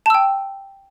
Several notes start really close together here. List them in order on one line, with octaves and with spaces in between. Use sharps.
A5 E6 G5